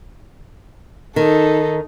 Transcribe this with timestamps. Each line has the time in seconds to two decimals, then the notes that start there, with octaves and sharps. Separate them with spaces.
1.16 D#3 D#4 A4